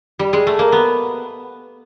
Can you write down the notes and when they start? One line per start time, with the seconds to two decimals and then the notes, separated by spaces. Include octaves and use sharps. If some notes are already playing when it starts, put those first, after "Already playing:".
0.19 G3
0.33 G#3
0.47 A3
0.59 A#3
0.72 B3